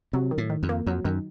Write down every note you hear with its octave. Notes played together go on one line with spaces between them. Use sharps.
C3 F#3
D#3
A2
D#3
F2
A#3
F2 F#3
F#2 D#3